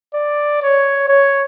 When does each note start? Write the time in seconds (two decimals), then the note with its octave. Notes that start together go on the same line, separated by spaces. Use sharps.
0.14 D5
0.63 C#5
1.08 C#5